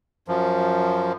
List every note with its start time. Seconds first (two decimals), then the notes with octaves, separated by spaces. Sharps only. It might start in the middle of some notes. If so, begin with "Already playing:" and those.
0.28 F#2 F3